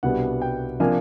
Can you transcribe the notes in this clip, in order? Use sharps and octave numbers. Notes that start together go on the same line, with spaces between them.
C2 B2 G3 B3 D4 F#5
G5
C3 F3 A#3 D4 G#5